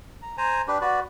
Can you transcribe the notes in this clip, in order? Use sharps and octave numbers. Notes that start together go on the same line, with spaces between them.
A#5
C5 G#5 A#5
D4 G4 B4
F#4 B4 D5